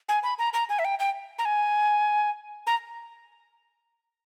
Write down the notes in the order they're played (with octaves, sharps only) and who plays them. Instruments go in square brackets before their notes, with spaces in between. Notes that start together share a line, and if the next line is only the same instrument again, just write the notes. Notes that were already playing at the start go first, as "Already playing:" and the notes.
[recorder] G#5
B5
A#5
A#5
G#5
E5
G5
G5
A#5
G#5
A#5